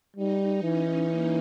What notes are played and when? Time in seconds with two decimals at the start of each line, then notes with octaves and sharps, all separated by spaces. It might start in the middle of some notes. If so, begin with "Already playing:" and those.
0.16 G3 D#4
0.63 E3 C#4
1.10 A#3